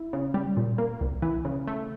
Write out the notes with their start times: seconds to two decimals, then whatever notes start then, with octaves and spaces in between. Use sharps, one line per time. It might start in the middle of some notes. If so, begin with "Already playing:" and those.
Already playing: E4
0.13 C#3
0.34 G3
0.57 A#2
0.78 A#3
1.01 C2
1.22 E3
1.45 C#3
1.67 A3